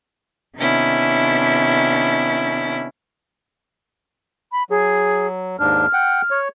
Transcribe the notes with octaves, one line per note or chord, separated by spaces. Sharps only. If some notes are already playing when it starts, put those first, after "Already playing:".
C3 D#3 B3 C#4 D4 E4
B5
F#3 G#4
D#2 G#2 D4 F6
F#5 G5
C#5